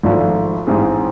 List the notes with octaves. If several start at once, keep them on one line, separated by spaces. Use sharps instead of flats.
G#1 G#2 F3 A3
A1 G#2 G#3 C4 G#4